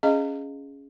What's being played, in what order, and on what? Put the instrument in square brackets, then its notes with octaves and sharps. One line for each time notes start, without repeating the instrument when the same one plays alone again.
[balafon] C#4 G#4 D#5 F5